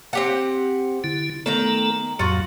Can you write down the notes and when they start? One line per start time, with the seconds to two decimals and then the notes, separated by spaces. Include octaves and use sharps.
0.13 C4 G4 F#5
1.04 D3 E4
1.46 D#3 A3 B3 A4 G5 A#5
2.19 F2 A2 F#3 F4 F#4